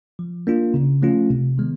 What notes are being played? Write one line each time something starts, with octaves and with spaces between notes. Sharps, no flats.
F3
A#3 D4 F4
C#3
F3 A3 C#4 F4
C3
D#3 G#3 B3